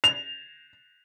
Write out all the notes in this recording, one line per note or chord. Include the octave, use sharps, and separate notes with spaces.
F7